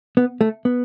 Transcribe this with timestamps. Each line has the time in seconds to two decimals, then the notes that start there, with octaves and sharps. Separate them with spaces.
0.17 B3
0.41 A3
0.65 B3